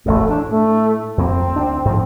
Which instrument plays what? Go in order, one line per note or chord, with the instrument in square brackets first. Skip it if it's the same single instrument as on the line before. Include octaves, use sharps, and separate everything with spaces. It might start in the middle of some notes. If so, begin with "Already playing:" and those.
[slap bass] E1 A1 F#2 [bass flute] A3
[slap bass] A2 [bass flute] D4
[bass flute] A3
[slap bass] F2 A#3 [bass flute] C4
[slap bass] D2 D4
G#2 F3